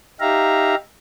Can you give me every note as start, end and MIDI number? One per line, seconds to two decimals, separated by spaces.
0.20 0.75 63
0.20 0.75 67
0.20 0.75 76
0.20 0.75 77
0.20 0.75 82